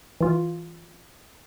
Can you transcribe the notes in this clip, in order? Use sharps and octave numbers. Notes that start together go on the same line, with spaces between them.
E3 F4